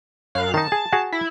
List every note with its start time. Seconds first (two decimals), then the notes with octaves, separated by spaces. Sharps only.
0.35 F#2 F5 F#6
0.54 D#3 D#4 A5
0.72 G#4
0.93 F#4 G#4
1.12 E4